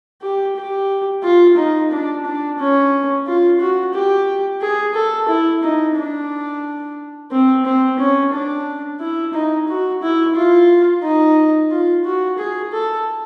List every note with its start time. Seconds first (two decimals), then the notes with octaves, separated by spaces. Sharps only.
0.22 G4
0.57 G4
1.23 F4
1.57 D#4
1.91 D4
2.25 D4
2.59 C#4
3.27 F4
3.60 F#4
3.94 G4
4.62 G#4
4.95 A4
5.29 E4
5.63 D#4
5.97 D4
7.31 C4
7.65 C4
7.99 C#4
8.33 D4
9.01 E4
9.34 D#4
9.68 F#4
10.02 E4
10.36 F4
11.03 D#4
11.71 F4
12.04 F#4
12.38 G#4
12.72 A4